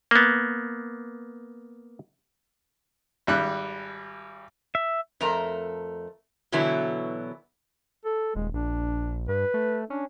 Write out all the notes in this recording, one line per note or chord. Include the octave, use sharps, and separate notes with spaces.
A#3 B3
G#1 G3 F#6
E5
F2 A3 A#4 A#5
B2 D3 E3 F#3 B3 E4
A4
D#1 G#3
A#1 D4
G2 B4
A3
C#4 D4